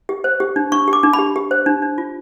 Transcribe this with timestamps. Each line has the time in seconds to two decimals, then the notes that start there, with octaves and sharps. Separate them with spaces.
0.09 G4
0.24 C5
0.40 G4
0.56 D4
0.72 D4 C#6
0.88 G4
0.93 D6
1.03 D4
1.13 B5
1.19 G4
1.36 G4
1.51 C5
1.66 D4
1.82 D4
1.98 F4